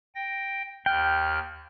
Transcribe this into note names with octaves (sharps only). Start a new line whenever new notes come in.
G5 A#6
D#2 G5 F6 F#6